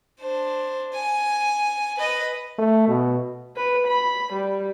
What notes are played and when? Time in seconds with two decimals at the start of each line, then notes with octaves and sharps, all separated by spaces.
0.20 D4 C5
0.93 G#5
1.97 B4 D#5
2.58 A3
2.88 B2
3.56 B4
3.87 B5
4.33 G3